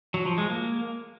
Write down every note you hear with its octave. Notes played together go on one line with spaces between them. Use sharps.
F#3
F3
G#3
A#3